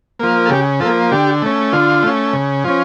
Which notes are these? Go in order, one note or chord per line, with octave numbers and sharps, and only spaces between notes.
F3 A#3
A4
C#3 G4
F3 A4
A#3
D3 G4
A3 C#4
D3 F4
A3 C#4
C#3
F3 C#4